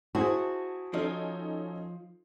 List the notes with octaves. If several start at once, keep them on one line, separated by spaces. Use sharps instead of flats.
E4 F#4 G#4 C5 A5
F3 C#4 D#4 A4